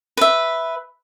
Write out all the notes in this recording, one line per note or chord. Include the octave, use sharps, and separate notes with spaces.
B4 E5